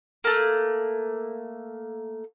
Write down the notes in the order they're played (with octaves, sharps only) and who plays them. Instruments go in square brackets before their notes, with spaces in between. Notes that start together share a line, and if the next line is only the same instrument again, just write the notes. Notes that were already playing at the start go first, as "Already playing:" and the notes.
[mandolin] A3 A#3